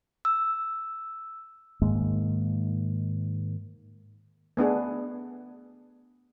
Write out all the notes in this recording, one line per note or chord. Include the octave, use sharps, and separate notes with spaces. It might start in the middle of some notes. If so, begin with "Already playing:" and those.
E6
G#2 D#3 G#3 A#3
A3 B3 D4 G#4